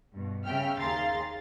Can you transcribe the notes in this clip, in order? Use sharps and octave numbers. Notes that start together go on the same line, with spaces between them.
G2 B2
C#3 C#4 E5 G5 F6
D#2 G#4 F5 A#5 C6 A6